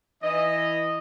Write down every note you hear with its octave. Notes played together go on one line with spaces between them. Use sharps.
E3 D#5